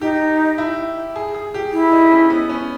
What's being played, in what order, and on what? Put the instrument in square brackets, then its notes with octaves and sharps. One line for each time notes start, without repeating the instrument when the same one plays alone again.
[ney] D#4 [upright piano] G4
[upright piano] E4
G#4
G#4
G4
[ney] E4
[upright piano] D#4
C#4
B3
C#4